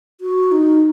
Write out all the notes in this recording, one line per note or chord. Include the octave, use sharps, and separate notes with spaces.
F#4
D#4